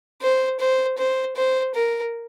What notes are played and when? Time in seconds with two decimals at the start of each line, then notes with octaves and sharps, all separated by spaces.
0.22 C5
0.60 C5
0.98 C5
1.36 C5
1.75 A#4